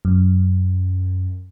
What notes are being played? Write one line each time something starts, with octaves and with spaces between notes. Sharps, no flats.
F#2